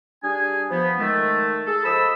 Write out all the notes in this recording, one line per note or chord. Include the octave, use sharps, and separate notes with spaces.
G3 D4 G#4 G#5
F3 B3
D#3 G#3 A3
G#4 A4
F3 A4 D#5 B5 E6